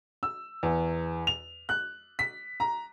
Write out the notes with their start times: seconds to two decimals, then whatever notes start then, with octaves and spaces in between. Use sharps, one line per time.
0.23 E6
0.63 E2
1.27 F7
1.69 F#6
2.19 B6
2.60 A#5